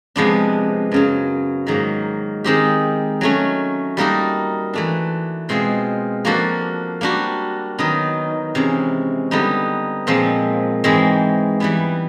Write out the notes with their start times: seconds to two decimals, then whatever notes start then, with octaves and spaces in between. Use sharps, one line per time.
0.16 C3 F3 G#3 B3 D4
0.92 F#2 C#3 F#3
1.67 G#2 D#3 F#3 A#3
2.44 D#3 G#3 C4 D#4 G4
3.21 F#3 A3 C#4
3.97 G3 A#3 D#4 F#4 A4
4.74 E3 A3 D4
5.49 B2 G#3 C4 F4 G#4
6.25 F3 A#3 D4 F#4 A4
7.01 G3 A#3 D4 F#4
7.78 D#3 F#3 B3 D#4
8.55 C3 E3 G#3 C#4
9.31 D3 G3 B3 D#4
10.07 A#2 F3 G#3 C4
10.84 G#2 E3 G#3 C4
11.60 E3 G3 B3 E4